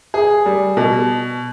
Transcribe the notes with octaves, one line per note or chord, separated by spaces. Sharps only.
G#4
G3
B2